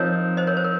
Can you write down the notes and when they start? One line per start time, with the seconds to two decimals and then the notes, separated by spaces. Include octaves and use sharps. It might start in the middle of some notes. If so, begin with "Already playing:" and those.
Already playing: F3 C4 D#4 A#4 C#5
0.37 C5 D#5
0.47 A#4 C#5
0.57 C5
0.64 A#4